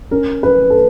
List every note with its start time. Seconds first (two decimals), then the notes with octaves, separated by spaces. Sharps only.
0.11 C#4 A#4
0.43 C#4 B4
0.70 A4